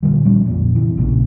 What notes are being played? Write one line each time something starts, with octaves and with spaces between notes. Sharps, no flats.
A#2 D3 D#3 G3
F3 G3 C#4
F2 A#2
C3 E3
A#1 A#2 C#3